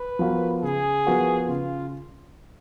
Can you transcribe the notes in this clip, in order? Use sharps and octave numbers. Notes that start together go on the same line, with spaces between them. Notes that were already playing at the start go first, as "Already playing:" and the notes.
Already playing: B4
F3 B3 F#4 A#4
C#3 G#4
F3 B3 F#4 A#4
C#3 F4